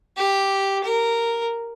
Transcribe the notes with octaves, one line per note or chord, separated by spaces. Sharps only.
G4
A#4